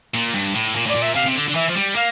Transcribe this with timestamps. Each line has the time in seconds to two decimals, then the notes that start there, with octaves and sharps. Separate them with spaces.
0.14 A#2
0.34 G2
0.54 A2
0.75 A#2
0.86 A2 D5
0.95 A#2
1.02 E5
1.15 C3 F5
1.26 C3
1.36 D3
1.49 D3
1.55 E3 E5
1.69 F3
1.76 G3
1.96 A#3 F5